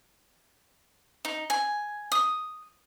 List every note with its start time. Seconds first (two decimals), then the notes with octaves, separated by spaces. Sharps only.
1.25 D#4
1.50 G#5
2.12 D#6